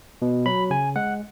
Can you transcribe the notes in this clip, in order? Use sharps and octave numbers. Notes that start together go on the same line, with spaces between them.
B2
F#3 B5
C#3 G#5
G#3 F#5